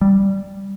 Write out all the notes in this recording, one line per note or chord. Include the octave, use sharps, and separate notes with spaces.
G3